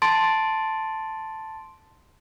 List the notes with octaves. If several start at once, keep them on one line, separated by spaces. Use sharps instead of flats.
A5 C6 A6 D7